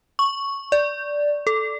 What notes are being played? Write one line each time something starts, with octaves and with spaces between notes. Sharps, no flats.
C#6
D5
A4